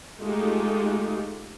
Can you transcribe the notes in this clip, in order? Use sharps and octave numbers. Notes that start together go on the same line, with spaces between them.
G#3 A3 D#4 F4 G4